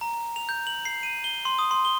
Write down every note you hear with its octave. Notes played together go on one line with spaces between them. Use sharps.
A#5
F7
G6
F#7
C7
D#7
G7
C6
D#6
C6
G7